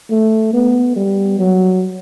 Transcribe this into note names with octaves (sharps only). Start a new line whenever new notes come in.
A3
B3
G3
F#3